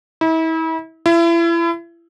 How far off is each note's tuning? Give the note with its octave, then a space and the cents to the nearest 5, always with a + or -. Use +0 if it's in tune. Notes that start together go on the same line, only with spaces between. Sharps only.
E4 -35
E4 +35